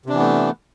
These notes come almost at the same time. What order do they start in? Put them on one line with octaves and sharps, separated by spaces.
C3 D4 E3 B3 A3